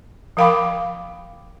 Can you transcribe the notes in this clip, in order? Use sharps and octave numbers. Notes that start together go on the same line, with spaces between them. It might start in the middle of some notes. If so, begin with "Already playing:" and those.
F3 A#4 F5 G5 B5 D6